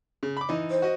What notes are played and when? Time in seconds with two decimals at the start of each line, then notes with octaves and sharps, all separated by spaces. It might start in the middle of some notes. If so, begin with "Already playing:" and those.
0.23 C#3
0.37 B5 D6
0.49 E3 D#4
0.71 C5
0.82 F#4 D#5